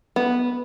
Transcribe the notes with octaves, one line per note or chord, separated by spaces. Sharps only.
B3